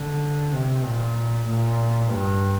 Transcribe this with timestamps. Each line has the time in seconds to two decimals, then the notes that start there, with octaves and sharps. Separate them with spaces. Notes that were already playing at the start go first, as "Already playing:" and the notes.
Already playing: D3
0.52 C3
0.84 A#2
1.46 A#2
2.08 G2